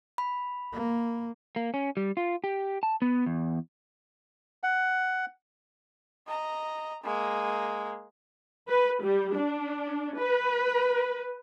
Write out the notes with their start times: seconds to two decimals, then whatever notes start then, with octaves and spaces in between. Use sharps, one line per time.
0.18 B5
0.73 A#3
1.56 A#3
1.74 C#4
1.97 G3
2.17 F4
2.44 G4
2.83 A5
3.02 B3
3.26 E2
4.63 F#5
6.28 D#5 A#5
7.04 G#3 A#3
8.69 B4
9.02 G3
9.35 D4
10.16 B4